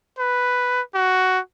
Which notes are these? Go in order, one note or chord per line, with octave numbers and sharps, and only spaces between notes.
B4
F#4